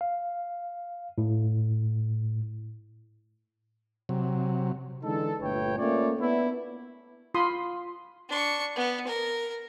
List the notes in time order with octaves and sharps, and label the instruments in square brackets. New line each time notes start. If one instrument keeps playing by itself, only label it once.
[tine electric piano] F5
A2
[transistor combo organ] C3 F#3
[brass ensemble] D3 E3 G#3 D#4 A4
G1 A#2 A3 B4 C#5 G5
A3 A#3 C#4 F4 C#5 D5
B3 D4 E4
[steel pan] F4 B5 C6 D#6
[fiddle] D4 C#6
B3
A#4